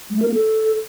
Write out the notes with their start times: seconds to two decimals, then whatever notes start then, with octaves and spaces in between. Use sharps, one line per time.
0.10 G#3
0.16 A3
0.22 A#4
0.28 A#3
0.34 A4